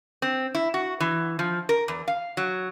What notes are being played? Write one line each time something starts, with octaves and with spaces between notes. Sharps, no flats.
C4
E4
F#4
E3
F3
A#4
E2
F5
F#3